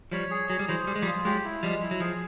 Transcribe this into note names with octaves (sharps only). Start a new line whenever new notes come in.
F3 G3 C#5
G#4
F#3 G#4
G3
E3 F#3 C5
G3 G#4
G#3
F3 G3
F4
F#3 G#3 G4
E4
F3 G3 G#3
E4
F#3
F3 G#4